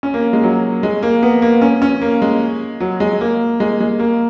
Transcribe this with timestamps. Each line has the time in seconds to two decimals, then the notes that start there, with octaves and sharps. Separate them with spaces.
0.03 C#4
0.14 A#3
0.33 G#3
0.43 F#3
0.83 G#3
1.03 A#3
1.23 B3
1.42 A#3
1.62 C#4
1.82 C#4
2.02 A#3
2.22 G#3
2.80 F#3
3.00 G#3
3.21 A#3
3.60 G#3
3.81 G#3
3.99 A#3